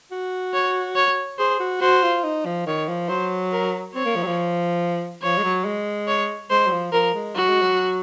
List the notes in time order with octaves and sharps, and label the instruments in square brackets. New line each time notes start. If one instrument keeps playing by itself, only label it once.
[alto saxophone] F#4
[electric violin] C#5
C#5
[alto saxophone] G#4 [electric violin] C5
[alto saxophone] F#4
[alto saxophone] F#4 [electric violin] C5
[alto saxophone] F4
D#4
F3
[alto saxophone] D#3 [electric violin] C#5
[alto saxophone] F3
[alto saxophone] F#3 [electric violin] C5
[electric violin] A#4
[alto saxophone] C4 [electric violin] C#5
[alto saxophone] A#3
F3
F#3
F3
[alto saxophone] F3 [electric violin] C#5
[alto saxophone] G#3
F#3
G#3
[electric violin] C#5
[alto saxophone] G#3 [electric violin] C5
[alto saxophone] F#3
F3
[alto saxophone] F3 [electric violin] A#4
[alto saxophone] G#3
[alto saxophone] F#3 [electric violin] F#4
[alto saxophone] G#3
F#3